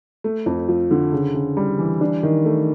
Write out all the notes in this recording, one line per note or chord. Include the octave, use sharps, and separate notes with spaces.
A3
F2
F3
D3
C#3
C#3
G3
E3
D4
D#3
A3